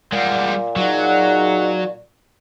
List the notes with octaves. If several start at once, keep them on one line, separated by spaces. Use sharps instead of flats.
A#2 G3 G#3 F#5
F#3 D#4 G#4 D5 F#5